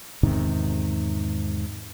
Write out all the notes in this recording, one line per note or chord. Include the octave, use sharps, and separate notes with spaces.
E2 G#2 C3 D#3